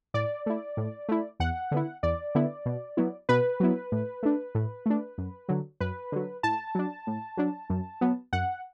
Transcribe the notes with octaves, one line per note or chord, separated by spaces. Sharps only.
A2 D5
A3 E4
A2
A3 E4
E2 F#5
D3 B3 E4
E2 D5
D3 B3 E4
B2
F#3 B3 E4
B2 B4
F#3 B3 E4
A2
A3 D4
A2
A3 D4
F#2
D3 F#3
F#2 B4
D3 F#3
A2 A5
F#3 D4
A2
F#3 D4
F#2
F#3 B3
F#2 F#5